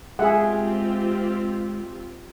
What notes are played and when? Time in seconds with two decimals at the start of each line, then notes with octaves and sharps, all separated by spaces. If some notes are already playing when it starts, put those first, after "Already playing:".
0.19 G#3 C4 F4 G4 G#4 E5 F#5